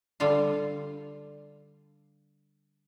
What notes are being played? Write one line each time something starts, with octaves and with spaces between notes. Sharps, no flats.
D3 G3 F4 F5